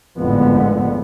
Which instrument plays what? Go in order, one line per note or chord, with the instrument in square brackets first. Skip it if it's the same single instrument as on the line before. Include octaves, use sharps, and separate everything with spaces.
[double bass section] G#1 F2 A2 D3 G#3 B3